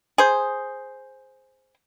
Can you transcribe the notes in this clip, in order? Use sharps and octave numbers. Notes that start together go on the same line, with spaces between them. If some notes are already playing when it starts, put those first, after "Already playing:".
G#4 C5